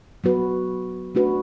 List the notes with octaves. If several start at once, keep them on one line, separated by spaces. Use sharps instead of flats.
F#3 B3 F#4 B4
A3 D4 F#4 B4